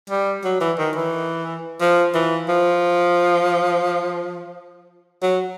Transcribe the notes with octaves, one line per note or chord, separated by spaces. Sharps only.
G3
F#3
E3
D#3
E3
F3
E3
F3
F#3